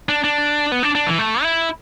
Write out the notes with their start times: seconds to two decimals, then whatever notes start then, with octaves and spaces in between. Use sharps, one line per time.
0.09 D4
0.24 D4
0.72 B3
0.83 D4
0.95 D4
1.06 E3
1.19 A3
1.43 E4